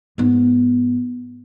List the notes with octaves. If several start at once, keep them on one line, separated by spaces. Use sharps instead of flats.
G#2 B3